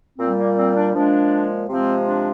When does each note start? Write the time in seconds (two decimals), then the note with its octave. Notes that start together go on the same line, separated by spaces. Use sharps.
0.19 A#2 G3 C4
0.38 A#3
0.57 C4
0.75 D4
0.94 A#2 F3 G#3 D4
1.68 C3 F3 G#3 C4
2.06 D4